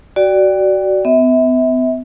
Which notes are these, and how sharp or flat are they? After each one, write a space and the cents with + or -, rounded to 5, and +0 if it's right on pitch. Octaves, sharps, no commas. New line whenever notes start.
F#4 +20 D5 +0 G5 +0
B3 +40 E5 -30